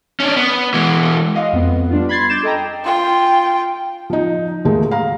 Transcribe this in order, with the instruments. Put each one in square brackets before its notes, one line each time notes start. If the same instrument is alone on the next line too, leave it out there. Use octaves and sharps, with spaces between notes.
[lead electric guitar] C#4 D4
B3
E3 G#3
[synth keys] D#5 F5 F#5 C6
F2 B3
G3 D4 F4
B5 C6 G#6 A6 C7
D6 G6 A6 E7
A4 D#5 G5 A#5
[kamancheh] F4 G5
[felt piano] F3 D#4
D#2 G#3 A3
F5 A#5